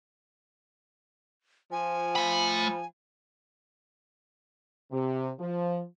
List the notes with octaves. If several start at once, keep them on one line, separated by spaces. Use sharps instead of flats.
F3 G#5
A3 B5
C3
F3